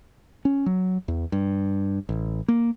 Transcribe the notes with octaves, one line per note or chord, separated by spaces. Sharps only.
C#4
F#3
E2
G2
A1
A#3